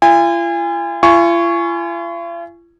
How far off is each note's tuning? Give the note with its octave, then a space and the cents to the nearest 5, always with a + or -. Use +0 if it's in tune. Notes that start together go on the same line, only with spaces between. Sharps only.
F4 -45 G#5 -30
F4 -45 G#5 +0 C#6 +0